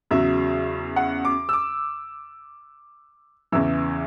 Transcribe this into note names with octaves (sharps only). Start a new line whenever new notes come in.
E2 C#3 F#3 E5
F#5
D6
E6
D6
E2 C#3 E3 E6